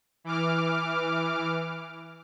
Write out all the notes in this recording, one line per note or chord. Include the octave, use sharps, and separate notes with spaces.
E3 D6 F6